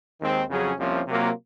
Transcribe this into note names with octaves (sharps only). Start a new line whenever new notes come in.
D#2 D#3 G#3 C4
F2 C#3 F#3 C#4 G#4
C2 C3 F3 A#3 C#4
C3 F#3 A#3 F4